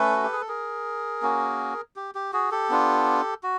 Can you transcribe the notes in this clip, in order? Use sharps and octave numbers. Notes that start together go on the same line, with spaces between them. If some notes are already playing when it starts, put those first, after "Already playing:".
Already playing: A3 C#4 A4 B4
F#4
G4
G#4
A4
G#4 A#4
A#3 C#4 F#4
G4
G4
F#4 G#4
G4 A4
B3 D4 F4
F#4